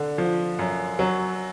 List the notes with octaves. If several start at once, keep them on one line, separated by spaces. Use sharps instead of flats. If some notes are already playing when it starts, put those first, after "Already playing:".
Already playing: D3
F3
F#2
F#3